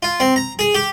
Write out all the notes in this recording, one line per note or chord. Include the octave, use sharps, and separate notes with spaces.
F4
C4
A#5
G#4
G4